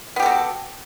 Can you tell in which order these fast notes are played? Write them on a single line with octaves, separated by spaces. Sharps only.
B3 G4 A4 F#4